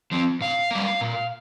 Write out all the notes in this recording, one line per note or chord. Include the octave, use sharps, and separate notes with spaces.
F3 C4
A#2 F5
G3 A#3
A#2